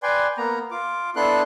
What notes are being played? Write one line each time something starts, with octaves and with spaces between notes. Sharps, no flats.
B4 D5 G5 G#5 C6
A#3 B3 A#5
F4 D6
B3 D4 E4 A4 C6 F#6